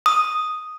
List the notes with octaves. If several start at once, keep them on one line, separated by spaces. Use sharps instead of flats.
D#6